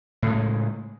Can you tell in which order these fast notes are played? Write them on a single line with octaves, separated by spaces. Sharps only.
A2 C#3 G#3